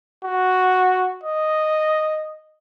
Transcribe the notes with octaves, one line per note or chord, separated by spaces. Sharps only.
F#4
D#5